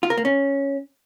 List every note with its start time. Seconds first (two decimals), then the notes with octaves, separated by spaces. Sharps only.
0.03 F4
0.10 A#4
0.17 A#3
0.25 C#4